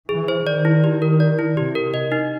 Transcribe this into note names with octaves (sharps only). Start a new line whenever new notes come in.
E3 G#4
C5
D#3 D5
E4
G4
A#4
D5
E4
C3 G4
A#4
D#5
D#4